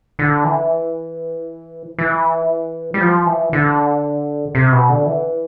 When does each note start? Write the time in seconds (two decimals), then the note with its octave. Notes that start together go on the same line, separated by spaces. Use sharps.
0.19 D3
0.44 E3
1.99 E3
2.94 G3
3.01 F3
3.26 E3
3.53 D3
4.55 C3
4.72 B2
4.89 D3
5.06 E3